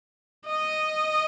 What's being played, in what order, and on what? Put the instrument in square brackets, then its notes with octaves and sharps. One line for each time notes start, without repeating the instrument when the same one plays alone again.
[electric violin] D#5